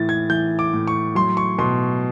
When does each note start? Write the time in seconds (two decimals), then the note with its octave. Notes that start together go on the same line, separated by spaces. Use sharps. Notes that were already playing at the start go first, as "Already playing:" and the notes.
Already playing: A2 E3 A6
0.09 G#6
0.30 E3 G6
0.59 D6
0.73 A2
0.87 C#6
1.15 F#3 C6
1.37 C#6
1.59 B2 C6